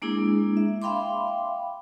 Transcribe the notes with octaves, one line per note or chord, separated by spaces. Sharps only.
G#3 A#3 D4 E4 G#4
E5
E5 F5 G5 B5 C6 D6